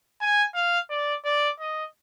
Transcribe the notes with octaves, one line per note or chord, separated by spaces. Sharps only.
G#5
F5
D5
D5
D#5